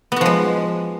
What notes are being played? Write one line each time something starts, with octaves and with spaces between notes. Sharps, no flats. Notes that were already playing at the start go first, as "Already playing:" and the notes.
F3 G#3 B3 F#4